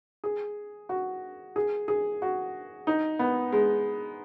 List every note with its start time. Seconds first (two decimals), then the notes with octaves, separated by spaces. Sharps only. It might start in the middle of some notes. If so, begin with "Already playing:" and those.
0.24 G#4
0.89 F#4
1.56 G#4
1.88 G#4
2.22 F#4
2.87 D#4
3.19 B3
3.52 G#3